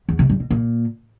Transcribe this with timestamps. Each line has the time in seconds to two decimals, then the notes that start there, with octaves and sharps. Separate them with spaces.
0.09 E2
0.19 C3
0.30 G2
0.40 B2
0.50 A#2